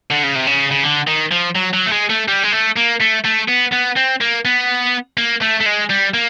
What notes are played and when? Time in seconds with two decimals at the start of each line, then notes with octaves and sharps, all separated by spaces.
0.11 D3
0.23 C#3
0.35 C3
0.47 C#3
0.71 C#3
0.83 D3
1.08 D#3
1.32 F3
1.56 F#3
1.74 F#3
1.86 A3
1.92 G#3
2.10 A3
2.28 G3
2.43 G#3
2.52 A3
2.76 A#3
3.00 A3
3.24 A3
3.48 B3
3.73 B3
3.97 C4
4.21 A#3
4.45 B3
5.17 A#3
5.41 A3
5.60 A3
5.66 G#3
5.90 G3
6.14 A#3